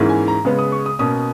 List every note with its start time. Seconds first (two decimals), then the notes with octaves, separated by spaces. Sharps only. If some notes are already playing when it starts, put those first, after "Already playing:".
Already playing: G#2 E3 A#3 C#4 E4
0.09 G#5
0.28 A#5
0.45 C#3 G#3 B3
0.59 D#6
0.72 C#6
0.86 D#6
0.99 B2 A#3 C#4 D#6